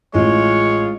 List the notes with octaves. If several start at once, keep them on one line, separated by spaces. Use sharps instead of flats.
A1 G#3 F4 C#5